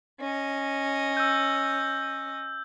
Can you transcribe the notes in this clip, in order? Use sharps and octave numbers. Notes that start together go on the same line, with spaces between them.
C#4 D#5
E6 G6